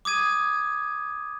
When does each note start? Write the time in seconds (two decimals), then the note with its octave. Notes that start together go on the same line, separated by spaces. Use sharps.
0.05 D6 D#6 G#6 D#7